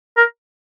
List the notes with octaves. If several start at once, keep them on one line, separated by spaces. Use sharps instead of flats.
A#4